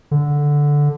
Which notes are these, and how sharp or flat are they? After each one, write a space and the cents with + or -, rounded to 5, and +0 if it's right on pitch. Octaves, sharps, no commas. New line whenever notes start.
D3 -5